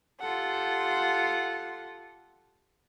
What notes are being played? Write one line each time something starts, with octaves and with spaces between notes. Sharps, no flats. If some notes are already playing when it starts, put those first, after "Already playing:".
F4 G4 A4 F#5